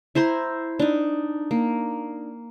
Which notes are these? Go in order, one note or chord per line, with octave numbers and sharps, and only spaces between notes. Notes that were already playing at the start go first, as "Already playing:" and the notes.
E4 C5 A#5 C6
D4 D#4
A#3